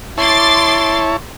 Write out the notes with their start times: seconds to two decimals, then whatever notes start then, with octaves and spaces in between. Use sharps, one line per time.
0.18 E4 C#5 A5 C6 D6 A6